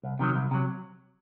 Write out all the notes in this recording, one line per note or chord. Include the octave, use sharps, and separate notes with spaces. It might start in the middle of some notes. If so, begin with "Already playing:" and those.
C2
C3 D#3 F#3
C2
C3 D#3 F#3